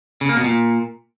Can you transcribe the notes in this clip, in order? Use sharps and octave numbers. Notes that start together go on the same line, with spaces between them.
C#3
A#3
B2
A#2